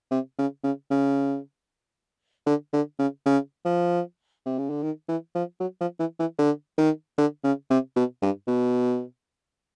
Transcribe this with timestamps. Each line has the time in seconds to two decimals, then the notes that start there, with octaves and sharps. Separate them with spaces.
0.11 C3
0.39 C#3
0.64 C#3
0.91 C#3
2.47 D3
2.73 D3
2.99 C#3
3.26 C#3
3.65 F3
4.46 C3
4.58 C#3
4.70 D3
4.83 D#3
5.09 E3
5.35 F3
5.60 F#3
5.81 F3
5.99 E3
6.20 E3
6.39 D3
6.78 D#3
7.18 D3
7.44 C#3
7.70 C3
7.96 B2
8.22 G2
8.48 B2